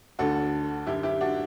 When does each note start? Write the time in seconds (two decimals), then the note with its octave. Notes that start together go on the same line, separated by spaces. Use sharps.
0.19 D2 D3 F#4 A4
0.86 F#2 E4 G4
0.90 D3
1.03 E4 G4
1.21 D4 F#4